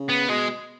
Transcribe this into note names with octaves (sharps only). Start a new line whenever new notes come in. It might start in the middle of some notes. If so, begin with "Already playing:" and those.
Already playing: C#3
B3
B2 G#3